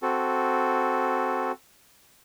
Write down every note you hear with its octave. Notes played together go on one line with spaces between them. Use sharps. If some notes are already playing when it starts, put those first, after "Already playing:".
C4 F#4 A4